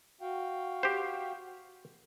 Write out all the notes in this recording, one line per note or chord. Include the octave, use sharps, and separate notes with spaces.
F#4 F5 G5
G4 C5